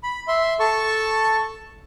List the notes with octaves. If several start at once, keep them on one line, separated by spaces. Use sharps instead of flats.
B5
E5 C6
A4 A5 C#6